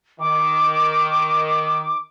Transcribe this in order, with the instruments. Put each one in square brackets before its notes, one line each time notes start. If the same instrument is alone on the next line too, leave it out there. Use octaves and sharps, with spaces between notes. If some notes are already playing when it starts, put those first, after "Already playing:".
[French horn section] D#3 [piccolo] D6